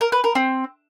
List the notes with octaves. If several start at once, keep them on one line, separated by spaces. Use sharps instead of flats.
A#4
B4
A#4
C4